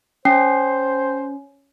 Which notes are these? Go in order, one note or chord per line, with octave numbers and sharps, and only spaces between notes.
C#4 C5 G5 C7